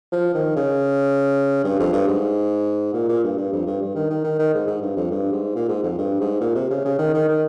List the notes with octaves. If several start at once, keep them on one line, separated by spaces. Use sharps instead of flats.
F3
D#3
C#3
G2
F2
G2
G#2
A#2
A#2
G2
G2
F2
G2
G2
D#3
D#3
D#3
D#3
G#2
G#2
G2
F2
G2
G#2
A#2
G#2
F2
G2
G#2
A#2
C3
C#3
C#3
D#3
D#3
D#3